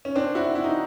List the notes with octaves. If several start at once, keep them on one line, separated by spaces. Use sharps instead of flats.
C#4
C4 D4
E4 F#4
E4
D#4